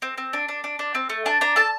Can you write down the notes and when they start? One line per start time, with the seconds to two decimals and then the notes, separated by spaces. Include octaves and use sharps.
0.02 C4
0.18 C4
0.33 D4
0.48 D4
0.64 D4
0.79 D4
0.95 C4
1.10 A3
1.26 D4 A5
1.41 D4 A#5
1.56 A4 A5